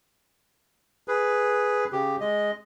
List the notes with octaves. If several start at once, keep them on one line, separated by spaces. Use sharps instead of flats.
G#4 B4
C#3 G4
G#3 D#5